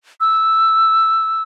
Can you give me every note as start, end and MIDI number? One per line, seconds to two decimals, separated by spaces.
0.20 1.43 88